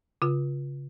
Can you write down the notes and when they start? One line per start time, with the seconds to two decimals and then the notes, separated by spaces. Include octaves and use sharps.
0.22 C#3 F4